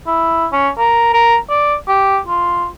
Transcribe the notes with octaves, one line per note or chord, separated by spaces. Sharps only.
E4
C#4
A#4
A#4
D5
G4
F4